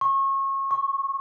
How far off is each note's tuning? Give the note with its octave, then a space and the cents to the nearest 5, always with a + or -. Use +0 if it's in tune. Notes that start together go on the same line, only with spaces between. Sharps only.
C#6 -30
C#6 +0